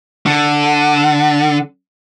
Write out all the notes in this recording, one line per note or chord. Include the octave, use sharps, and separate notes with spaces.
D3